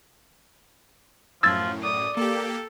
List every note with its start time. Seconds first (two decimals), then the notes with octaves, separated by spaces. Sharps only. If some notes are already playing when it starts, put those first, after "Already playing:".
1.43 F#2 A2 F3 E6 G#6 A6
1.83 D5 D#6
2.17 A#3 G4 A4